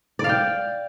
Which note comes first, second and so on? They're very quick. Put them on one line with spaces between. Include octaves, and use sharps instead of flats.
D5 F5 G5